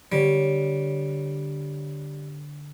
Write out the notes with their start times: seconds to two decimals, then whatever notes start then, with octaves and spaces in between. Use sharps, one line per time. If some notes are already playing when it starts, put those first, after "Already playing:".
0.12 D3 G3 C#5